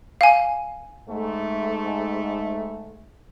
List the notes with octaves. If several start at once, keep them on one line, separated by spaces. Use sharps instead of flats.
F5 G#5
G#2 A3